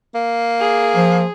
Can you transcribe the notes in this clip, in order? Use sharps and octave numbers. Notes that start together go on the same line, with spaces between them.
A#3
G#4
F3